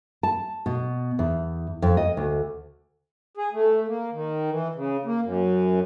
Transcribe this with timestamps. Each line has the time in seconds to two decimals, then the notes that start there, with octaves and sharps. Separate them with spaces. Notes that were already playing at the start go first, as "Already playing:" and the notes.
0.23 A5
0.66 B2
1.19 E2
1.82 F2
1.97 D#5
2.17 D2
3.37 G#4
3.53 A3
3.88 A#3
4.12 D#3
4.51 E3
4.75 C#3
5.05 A#3
5.24 F#2